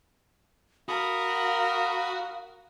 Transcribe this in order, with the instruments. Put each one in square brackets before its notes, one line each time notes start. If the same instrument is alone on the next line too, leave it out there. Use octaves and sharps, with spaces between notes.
[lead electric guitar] F#4 [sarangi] A#4 [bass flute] F5 [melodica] B5 D#6